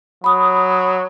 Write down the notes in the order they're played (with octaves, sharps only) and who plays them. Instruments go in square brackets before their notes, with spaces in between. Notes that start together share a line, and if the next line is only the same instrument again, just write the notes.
[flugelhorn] F#3 [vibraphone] B5 D#6